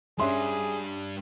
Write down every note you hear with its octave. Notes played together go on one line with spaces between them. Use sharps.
G3 C#4 D4 G#4 E5 C6